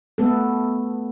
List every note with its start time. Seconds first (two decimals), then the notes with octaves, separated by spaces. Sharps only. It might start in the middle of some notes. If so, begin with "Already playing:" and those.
0.18 A3 B3 A4